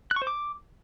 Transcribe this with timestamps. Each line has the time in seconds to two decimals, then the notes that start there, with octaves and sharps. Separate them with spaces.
0.11 F#6
0.16 C#6
0.22 C5
0.27 D6